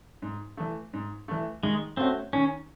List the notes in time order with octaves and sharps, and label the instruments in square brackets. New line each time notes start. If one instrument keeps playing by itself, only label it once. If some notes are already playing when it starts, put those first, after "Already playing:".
[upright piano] G#2
E3 A3
G#2
E3 A3
[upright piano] D#3 [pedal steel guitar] G#3
[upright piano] A3 C#4 F#4 [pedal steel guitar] C4
[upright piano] D#3 [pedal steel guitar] C#4